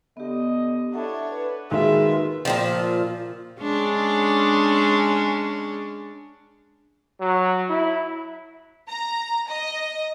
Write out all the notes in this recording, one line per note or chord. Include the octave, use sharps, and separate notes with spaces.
D3 B3 G4 D#5
D4 E4 A4 C#5 F#5
B4
D#3 G#3 A#3 F4 F#4 G#4 E5
A#2 C#3 F3
G#3 C#4 D4
F#3
E4
A#5
D#5